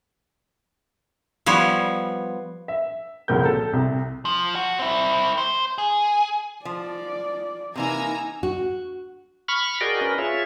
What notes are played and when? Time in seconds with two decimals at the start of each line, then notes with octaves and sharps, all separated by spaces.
1.46 F3 G3 B3 C#5
2.68 E5
3.28 F1 C#2 A#2 F#3 A#4 G6
3.45 A4
3.73 C2 C3
4.25 F3
4.55 F#4
4.79 C4 E4
5.38 C5
5.78 G#4
6.65 F3 D5
7.75 C3 E3 A#3 D#4 G#5 A#5 E6
8.43 F#4
9.48 B5 C#6 F6
9.81 F#4 G#4 A#4 D5 D#5 G5
10.01 C#4 A#4 B4
10.18 F4 G#4 C#5 E5